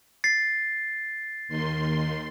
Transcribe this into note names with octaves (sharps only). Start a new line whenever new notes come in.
A6 C7
D#2 D#3 C6